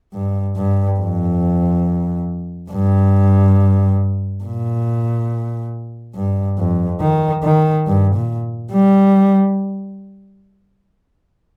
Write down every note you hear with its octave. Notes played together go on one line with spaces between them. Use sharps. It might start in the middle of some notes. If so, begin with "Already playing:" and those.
G2
G2
F2
G2
A#2
G2
F2
D#3
D#3
G2
A#2
G3